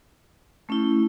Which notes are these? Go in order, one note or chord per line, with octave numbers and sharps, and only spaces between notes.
A3 C#4 E4